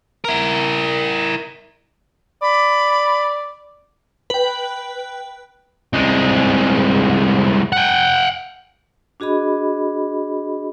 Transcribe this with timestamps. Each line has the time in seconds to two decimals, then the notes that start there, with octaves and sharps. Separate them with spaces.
0.25 E4 A#4
2.42 D5 B5
4.30 B4 G5
5.93 C2 G#3
7.73 F#5 G5
9.20 D4 F#4 G#4 D#5 B5